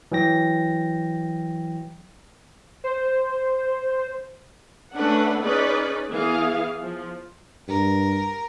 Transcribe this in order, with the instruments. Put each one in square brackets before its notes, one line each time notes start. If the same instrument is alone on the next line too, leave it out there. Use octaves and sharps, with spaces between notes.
[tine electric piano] E3 F#3 G5 A#6
[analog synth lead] C5
[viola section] A3 C#4 D4 B4 F#5
C#4 D#4 G#4 B4 D5
E3 B3 G#4 F5
F3
[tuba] G2 [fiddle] A#4